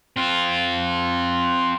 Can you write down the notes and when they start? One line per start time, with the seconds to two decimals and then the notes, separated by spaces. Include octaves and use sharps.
0.17 C4 F4